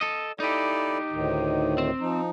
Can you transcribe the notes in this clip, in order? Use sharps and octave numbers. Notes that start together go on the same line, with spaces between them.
A4 D#5
D#4 E4 G4 A4 D5
D2 A2 D#3
C4
F3 D#4